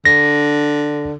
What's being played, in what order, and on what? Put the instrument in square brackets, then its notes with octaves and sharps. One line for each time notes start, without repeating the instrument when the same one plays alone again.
[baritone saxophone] D3 [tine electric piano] A#6